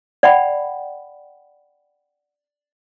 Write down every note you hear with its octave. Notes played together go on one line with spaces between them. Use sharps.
D5 F#5 G5 B5